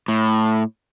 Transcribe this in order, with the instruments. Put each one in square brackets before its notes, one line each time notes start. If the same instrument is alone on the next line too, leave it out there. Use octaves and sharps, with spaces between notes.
[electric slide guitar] A2